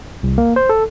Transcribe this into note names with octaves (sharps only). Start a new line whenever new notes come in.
C2
A#3
C5
A4